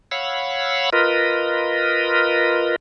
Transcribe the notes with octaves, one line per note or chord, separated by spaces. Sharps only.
C#5 F5 F#5 B5 E6
F4 A#4 B4 D#5